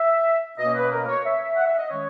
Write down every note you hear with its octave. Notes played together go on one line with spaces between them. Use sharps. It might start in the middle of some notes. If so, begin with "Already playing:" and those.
Already playing: E5
B2 A#3 C#4 D#5
B4
A#4
C#5
E5
F#5
E5
D#5
D#3 G#3 C#4 C#5